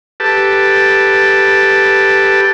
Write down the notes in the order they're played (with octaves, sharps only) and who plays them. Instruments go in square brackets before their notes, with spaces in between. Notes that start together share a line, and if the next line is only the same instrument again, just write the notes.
[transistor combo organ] G4 A4 B4 A5